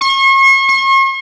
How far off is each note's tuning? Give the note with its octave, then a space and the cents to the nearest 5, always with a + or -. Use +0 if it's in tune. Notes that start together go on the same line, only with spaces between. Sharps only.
C#6 -40
C#6 -45